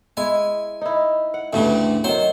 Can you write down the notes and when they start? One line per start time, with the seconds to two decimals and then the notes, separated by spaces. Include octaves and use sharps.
0.17 G#3 E4 G#5
0.81 D#4 E4
1.34 F#5
1.53 D2 G2 C#3 E3 A3
2.04 D#3 F#3 C5